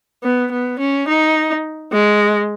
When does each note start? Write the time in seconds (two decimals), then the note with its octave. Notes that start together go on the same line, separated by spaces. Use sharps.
0.23 B3
0.52 B3
0.79 C#4
1.08 D#4
1.92 G#3